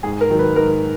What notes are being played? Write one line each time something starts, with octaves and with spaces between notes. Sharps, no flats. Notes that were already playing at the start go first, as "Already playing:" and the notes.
G#2 G#4
A#4
D#3 F#3
B4
G#2 A#4